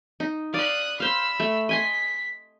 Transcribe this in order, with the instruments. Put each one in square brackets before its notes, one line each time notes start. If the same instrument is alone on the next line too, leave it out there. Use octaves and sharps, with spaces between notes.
[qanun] D#4
[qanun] D5 F5 [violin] D#6 F#6
[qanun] C5 F5 [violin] B5 E6
[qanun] A3
[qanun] D#5 G#5 C6 [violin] B6